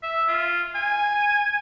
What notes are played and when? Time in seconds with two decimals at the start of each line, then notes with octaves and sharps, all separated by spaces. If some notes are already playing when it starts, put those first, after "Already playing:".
0.03 E5
0.28 F4
0.75 G#5